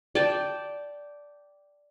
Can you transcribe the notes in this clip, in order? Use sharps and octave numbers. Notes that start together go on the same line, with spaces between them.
D5 G5 A5